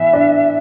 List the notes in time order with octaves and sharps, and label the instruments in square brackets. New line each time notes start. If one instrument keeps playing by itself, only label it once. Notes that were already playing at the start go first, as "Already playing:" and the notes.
Already playing: [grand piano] E3 B3 [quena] E5
[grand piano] D4